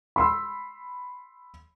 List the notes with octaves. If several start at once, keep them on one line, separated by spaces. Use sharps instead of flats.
B5 C6 E6